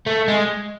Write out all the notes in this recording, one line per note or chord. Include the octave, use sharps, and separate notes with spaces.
A3
G#3